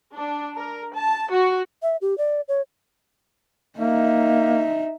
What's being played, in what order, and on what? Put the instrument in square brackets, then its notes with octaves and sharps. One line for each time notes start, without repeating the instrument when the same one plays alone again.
[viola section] D4
A#4
A5
F#4
[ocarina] E5
G4
D5
C#5
[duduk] A#3 [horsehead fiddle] D#4 E5